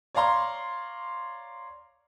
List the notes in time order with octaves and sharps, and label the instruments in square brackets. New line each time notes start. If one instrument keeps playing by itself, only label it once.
[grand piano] C#5 D5 F5 A#5 C6